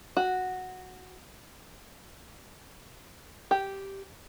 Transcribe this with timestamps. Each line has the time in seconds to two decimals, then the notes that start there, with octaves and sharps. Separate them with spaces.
0.17 F#4
3.51 G4